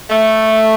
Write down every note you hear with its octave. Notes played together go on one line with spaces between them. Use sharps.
A3